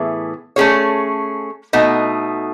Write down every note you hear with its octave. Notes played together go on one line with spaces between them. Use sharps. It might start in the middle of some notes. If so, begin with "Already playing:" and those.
Already playing: A2 E3 B3 E4 G#4
A3 C#4 G#4 C#5
B2 A3 D#4